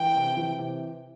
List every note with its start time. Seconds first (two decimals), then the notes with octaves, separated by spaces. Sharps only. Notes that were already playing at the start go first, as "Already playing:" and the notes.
Already playing: E3 G5
0.15 C3
0.37 E3
0.58 C3